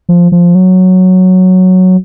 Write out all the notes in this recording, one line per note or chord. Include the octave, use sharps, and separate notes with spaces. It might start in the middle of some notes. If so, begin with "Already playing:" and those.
F3
F3
F#3